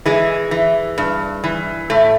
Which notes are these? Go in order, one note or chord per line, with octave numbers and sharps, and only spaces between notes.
E3 G#3
E3
G2
E3
A2 A3